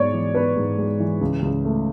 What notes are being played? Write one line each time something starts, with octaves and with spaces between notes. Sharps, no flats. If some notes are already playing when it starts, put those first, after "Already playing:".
Already playing: G#2 G#3 B3 C#5 D5
E3
B3 B4
G#2
G#3
E3
C#2
C#2
A3